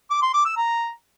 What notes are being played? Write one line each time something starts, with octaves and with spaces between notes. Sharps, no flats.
D6
C6
D6
E6
A#5